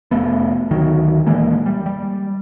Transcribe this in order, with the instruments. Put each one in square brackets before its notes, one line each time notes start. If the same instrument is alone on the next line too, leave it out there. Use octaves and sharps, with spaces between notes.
[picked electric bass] F1 A3 B3
D2 D#3 F#3
D#1 E3 G#3 A#3
G3
G3